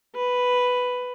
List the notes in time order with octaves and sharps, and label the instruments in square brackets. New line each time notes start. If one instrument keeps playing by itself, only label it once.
[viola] B4